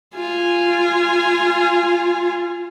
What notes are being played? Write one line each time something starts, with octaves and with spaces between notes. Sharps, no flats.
F4 G#5